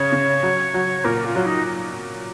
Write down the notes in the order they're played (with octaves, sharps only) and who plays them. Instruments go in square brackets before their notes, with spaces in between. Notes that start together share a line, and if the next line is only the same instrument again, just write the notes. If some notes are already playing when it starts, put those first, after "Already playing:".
Already playing: [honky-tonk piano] C#3 [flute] C#5
[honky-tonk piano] C#3
F#3
F#3
[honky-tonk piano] A#2 [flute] A#4
[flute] F4
[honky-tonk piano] F#3
[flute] D#4